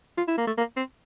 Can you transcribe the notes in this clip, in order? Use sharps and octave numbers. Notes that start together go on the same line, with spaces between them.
F4
E4
A#3
A3
A#3
C4